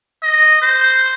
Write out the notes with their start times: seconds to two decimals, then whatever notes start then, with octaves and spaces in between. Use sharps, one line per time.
0.22 D#5
0.62 C5